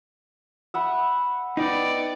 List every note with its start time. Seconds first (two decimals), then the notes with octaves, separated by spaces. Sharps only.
0.74 E5 F#5 B5
1.57 B3 D#4 D5 G5